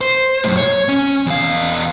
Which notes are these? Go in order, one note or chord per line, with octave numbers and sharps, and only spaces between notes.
C5
F#2 A2
C#5
C#4
E2 F5